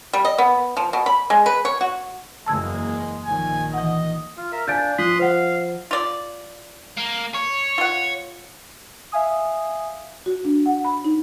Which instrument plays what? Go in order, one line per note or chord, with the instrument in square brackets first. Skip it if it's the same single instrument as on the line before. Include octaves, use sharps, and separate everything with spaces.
[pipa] G3
D#5
B3
F3
B2
B5
G#3
B4
C#5
F#4
[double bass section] F#1 E2 A#3 [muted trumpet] G#3 [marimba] A5 E6 G#6
[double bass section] A#1 D#3 [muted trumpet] G#5
[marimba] E3 F#5 [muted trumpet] D#5
[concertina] F4
A#4 E5
[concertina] D4 [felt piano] F5 G#5 [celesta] G6 A6 D7
[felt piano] F3 [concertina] C6 D#6 F#6 [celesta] B6
[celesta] C5 F#5 [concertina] F5
[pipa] F4 D5
[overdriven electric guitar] A#3
C#5
[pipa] F4 F#5
[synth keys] E5 F5 G#5 D#6
[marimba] F#4
D4
F#5
B5
D#4